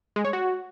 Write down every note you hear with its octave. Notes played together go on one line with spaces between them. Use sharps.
G#3
C#5
F#4